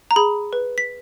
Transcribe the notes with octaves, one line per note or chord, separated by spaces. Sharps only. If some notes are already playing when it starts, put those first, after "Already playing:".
A#5
G#4 B5
B4
B6